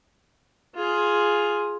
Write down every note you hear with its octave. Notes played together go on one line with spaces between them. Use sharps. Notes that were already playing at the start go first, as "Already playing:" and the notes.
F4 G#4